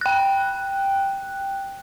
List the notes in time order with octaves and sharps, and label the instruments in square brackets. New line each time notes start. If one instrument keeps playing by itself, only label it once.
[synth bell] G5 F#6